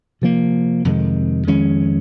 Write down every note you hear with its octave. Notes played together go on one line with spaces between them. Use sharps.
C3 F3 A#3
F2 C3 D#3 G#3
F2 D#3 G#3 C#4